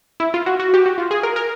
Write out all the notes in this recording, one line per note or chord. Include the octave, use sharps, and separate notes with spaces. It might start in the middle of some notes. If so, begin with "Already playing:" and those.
E4
F4
F#4
F#4
G4
F#4
F4
G#4
A#4
A#4